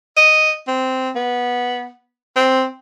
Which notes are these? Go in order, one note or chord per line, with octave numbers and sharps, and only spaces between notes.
D#5
C4
B3
C4